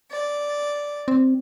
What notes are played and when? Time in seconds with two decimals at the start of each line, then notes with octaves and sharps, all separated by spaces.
0.10 D5
1.08 C4